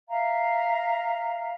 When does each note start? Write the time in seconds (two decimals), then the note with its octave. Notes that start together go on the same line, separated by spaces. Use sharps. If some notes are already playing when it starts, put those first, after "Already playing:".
0.09 E5 F5 A#5